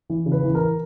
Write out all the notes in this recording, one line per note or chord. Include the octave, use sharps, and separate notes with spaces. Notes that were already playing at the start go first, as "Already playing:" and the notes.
E3
C#3
B4
E3
A#4